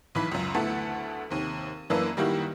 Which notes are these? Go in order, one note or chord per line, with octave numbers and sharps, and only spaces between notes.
B1 E3 B5 B6
C#2 F#2
D2 A3 B3 E4 A4 F#5
D#2 C3
F#2 E3 A#3 D4 B4 E6
D#3 G3 A#3 E4 F#4 G4